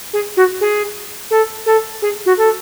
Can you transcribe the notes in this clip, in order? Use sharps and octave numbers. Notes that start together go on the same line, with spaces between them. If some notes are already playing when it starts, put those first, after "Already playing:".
G#4
F#4
G#4
A4
A4
G#4
F#4
A4